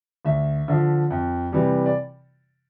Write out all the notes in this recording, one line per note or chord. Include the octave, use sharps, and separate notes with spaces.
D2 E5
D3 F3
F2
C3 E3 G3
D5